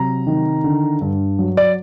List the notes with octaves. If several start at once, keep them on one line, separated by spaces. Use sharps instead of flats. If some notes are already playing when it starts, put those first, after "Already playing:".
Already playing: C3 F#3 A#5
D#3
D3
G2
F#3
D5